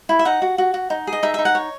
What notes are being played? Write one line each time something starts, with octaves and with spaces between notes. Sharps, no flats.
E4
E5
D#4 F#5
F#4
F#4
F#4
D#4
G#4
D#5
D#4 E5
D#4 E5
F#5
C#5